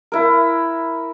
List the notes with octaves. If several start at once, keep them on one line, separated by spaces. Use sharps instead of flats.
E4 A#4